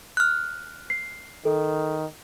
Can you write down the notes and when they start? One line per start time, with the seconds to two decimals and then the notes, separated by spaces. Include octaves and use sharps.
0.17 F6 F#6
0.90 C7
1.45 D#3 A4